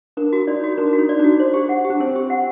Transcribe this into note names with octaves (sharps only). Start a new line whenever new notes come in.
D4 A#4
F#4
D#4 D5
F#4
D4 A#4
F#4
D#4
D5
D4
F#4
C5
G4
F#5
G4
D4
C4 C5
G4
F#5